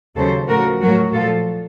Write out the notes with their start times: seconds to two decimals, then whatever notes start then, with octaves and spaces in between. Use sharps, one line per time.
0.16 D#2 C#3 F#3 A4 C5
0.49 A2 F3 F#4 A#4
0.81 A2 F#3 F#4 A#4
1.13 A#2 F3 F4 A4